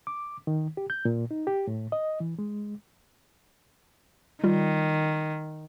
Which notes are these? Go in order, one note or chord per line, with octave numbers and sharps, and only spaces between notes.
D6
D#3
G4
G6
A#2
D#4
G4
A2
D#5
E3
G#3
D#3 G3 F4